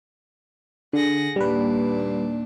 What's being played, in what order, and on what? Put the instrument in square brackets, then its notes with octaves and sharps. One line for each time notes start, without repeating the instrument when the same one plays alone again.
[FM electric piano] D3 [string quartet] G#4 F#5 A#6
[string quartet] D#2 A#2 D4 [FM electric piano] G3 B4